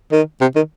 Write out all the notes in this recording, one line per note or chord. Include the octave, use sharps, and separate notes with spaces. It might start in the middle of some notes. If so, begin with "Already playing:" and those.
D#3
C3
D#3